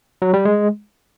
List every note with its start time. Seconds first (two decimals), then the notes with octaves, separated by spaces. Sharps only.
0.22 F#3
0.34 G3
0.45 G#3